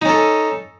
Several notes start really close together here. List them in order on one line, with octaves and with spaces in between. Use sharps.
D#4 C#4 A4